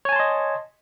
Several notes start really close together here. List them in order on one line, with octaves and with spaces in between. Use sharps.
C#5 G#5 A5 C6 D#5